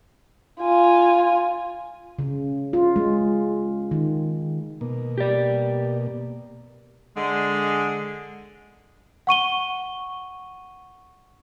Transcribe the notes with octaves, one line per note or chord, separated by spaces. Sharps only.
F4 G#5
C#3
F4
G#3
D#3
B2 A#3
G4 D5
D3 G#3
F#5 C#6 D#7 G7